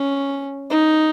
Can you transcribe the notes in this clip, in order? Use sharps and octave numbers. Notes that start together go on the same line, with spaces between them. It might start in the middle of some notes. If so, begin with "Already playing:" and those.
Already playing: C#4
D#4